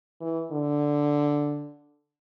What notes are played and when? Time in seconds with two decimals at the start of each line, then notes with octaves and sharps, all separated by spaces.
0.21 E3
0.52 D3